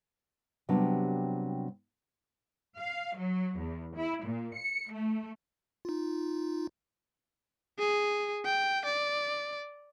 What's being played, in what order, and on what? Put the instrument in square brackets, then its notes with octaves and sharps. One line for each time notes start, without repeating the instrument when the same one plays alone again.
[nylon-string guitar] C3 F#3 G3 B3 D4
[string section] F5
F#3
E2
E4
A#2
C#7
A3
[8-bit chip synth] D#4 F4
[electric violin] G#4
G5
D5